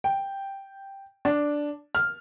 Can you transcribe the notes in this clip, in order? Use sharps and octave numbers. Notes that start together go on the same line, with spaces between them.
G5
D4
F6